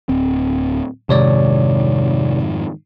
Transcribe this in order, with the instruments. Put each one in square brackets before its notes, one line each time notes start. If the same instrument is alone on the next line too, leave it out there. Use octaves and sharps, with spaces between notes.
[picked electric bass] D1 C4
[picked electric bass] F2 G#2 D#3 [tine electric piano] C3 C#5 D5